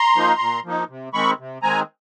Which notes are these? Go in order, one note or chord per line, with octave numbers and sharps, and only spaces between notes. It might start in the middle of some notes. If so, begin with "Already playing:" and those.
Already playing: A#5 C6
F3 A#3 D#4
A#2
F3 A#3 D#4
C3
D#3 G#3 C4 B5 C#6
C3
D#3 G#3 C4 G#5 A#5